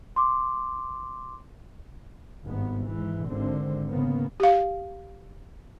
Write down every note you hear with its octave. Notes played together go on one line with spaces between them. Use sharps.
C6 D6
G#1 G2 B3
G#2 E3
G#1 D3 C4
C#3 A#3 B3
G4 F5